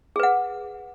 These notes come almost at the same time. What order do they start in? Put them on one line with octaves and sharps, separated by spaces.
G#4 B4 F#5